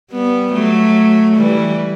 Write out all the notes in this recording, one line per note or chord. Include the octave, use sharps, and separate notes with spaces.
G3 B3
F#3 A3
E3 G3